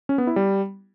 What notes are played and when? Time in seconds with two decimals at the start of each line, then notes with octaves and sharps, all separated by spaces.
0.09 C#4
0.18 B3
0.27 E4
0.36 G3